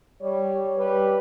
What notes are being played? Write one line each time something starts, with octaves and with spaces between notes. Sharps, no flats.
G3 C#5
G3 G4 B4